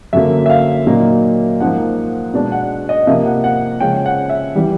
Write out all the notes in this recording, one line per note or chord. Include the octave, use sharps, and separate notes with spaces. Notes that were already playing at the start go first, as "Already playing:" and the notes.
F#2 D3 F#3 A#3 E5
E5
F5
A#2 F#3 A#3 D#4
G#2 F3 A#3 F#5
B2 G#3 B3 D4
F#5
D#5
C3 F3 A#3 E5
F#5
F#5
C#3 F3 G#3 C#4 G5
F#5
E5
E3 G3